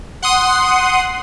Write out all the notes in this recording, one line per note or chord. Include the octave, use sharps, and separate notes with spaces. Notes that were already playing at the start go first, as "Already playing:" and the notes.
F#5 C6 D#6